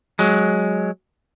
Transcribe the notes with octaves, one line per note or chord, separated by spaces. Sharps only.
F#3 G#3